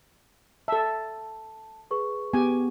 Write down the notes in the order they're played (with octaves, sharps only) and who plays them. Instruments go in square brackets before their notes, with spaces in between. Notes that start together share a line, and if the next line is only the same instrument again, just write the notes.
[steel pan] A4 E5 [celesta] A5
[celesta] G#4 B4 C#6
[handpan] B3 [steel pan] G4 G#5